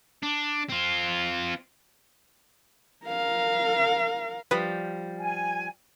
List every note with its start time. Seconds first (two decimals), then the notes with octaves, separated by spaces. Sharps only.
0.23 D4
0.69 C4 F4
3.06 A#4 F5
4.51 F3 G3 B4
5.20 G#5